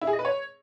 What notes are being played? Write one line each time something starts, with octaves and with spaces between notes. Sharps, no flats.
E4
G#4
D#5
B4
C#5